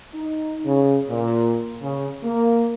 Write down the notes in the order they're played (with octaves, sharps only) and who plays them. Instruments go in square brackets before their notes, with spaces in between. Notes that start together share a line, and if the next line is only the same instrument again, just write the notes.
[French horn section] D#4
C#3
A#2
C#3
A#3